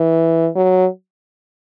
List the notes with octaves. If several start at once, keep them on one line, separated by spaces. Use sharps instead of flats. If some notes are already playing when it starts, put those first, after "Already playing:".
Already playing: E3
F#3